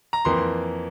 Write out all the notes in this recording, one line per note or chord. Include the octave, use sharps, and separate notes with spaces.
A#5
F2 E3 A#3 C6